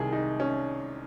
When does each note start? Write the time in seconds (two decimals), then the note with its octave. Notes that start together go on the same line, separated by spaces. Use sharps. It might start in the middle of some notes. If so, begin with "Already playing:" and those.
Already playing: C2 C3 D#3 G#4
0.13 D#4
0.40 C#4